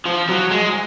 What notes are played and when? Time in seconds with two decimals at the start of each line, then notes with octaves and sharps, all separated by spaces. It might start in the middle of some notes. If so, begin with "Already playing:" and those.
0.06 F3
0.29 F#3
0.51 G#3